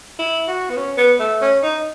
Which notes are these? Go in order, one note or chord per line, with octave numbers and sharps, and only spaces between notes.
E4
F#4
B3
C#4
B3
A3
C#4
D#4